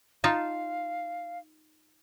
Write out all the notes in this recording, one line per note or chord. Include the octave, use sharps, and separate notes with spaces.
D#4 F4 F5 A5